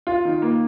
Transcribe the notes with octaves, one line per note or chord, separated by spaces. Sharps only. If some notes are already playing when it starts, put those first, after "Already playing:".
F4
D#3
A#3